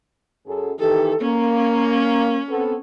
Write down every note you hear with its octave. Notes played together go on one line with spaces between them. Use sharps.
F#2 G#4 A4
D#3 E3 G4 A4
A#3 C#4
B3 C4 A4